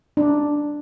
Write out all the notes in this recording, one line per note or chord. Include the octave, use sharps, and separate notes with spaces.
D4